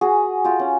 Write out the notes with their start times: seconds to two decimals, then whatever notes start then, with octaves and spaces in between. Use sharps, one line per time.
0.01 F#4 G#4
0.44 F4 G4
0.59 C#4